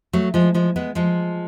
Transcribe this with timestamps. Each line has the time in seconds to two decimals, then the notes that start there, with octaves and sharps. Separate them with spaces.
0.13 F#3 A3
0.34 F3 G#3
0.54 F3 G#3
0.76 G#3 B3
0.95 F3 G#3